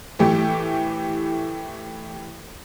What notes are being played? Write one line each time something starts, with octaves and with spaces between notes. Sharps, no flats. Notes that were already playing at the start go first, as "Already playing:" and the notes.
A2 E3 A3 G4